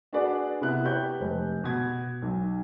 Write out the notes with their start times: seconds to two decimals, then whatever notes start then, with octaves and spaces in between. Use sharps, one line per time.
0.13 D4 F#4 G#4 B4 D5
0.61 C3 B3 E4 F#6
0.84 G4 B4 C#5 G6
1.21 F1
1.64 B2 G#6
2.22 B1